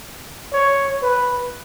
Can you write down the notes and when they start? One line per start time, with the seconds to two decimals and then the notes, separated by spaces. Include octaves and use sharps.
0.53 C#5
1.03 B4